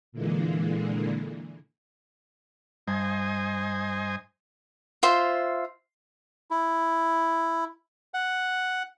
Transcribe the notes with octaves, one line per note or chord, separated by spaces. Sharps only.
A#2 D3 E3 G#3 A#3
G2 C5 D#5 G#5
F4 C5 E5
E4
F#5